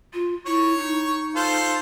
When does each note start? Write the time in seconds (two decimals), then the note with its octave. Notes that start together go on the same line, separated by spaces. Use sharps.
0.14 F4
0.46 E4 C#5 C#6
0.77 D#4
1.36 F4 A4 C5